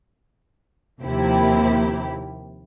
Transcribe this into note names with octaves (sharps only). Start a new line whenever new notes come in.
D#2 C3 F3 A#3 E4 G4